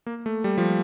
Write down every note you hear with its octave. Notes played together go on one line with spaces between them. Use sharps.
A#3
A3
G3
F3